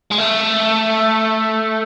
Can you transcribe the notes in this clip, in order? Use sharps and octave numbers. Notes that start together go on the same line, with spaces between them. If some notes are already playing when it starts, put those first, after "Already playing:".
G#3
A3